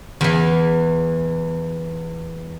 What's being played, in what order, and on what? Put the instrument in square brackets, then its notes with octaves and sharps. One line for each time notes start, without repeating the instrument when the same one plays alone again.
[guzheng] E2 E3